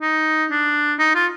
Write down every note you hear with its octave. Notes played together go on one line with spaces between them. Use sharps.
D#4
D4
D#4
F4